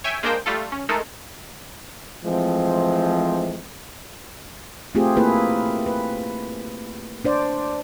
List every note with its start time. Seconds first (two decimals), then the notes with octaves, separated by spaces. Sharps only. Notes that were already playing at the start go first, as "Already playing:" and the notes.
0.04 C#5 E5 G5 G#5
0.23 G#3 A#3 D4 A#4 C5 G5
0.46 G3 A3 F4 A4
0.72 C#4
0.89 G#3 A3 D#4 A4 A#4
2.24 E3 F3 G#3 A3 C4
4.95 A3 C4 F4 G4 G#4
5.16 A#3 E4 G#4 B4
5.86 B4
7.25 D4 C5 D5